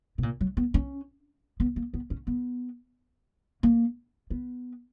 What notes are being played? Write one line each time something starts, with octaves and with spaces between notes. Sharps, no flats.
B2
A#2
F#3
B3
C#4
B3
A#3
B3
C#4
B3
A#3
B3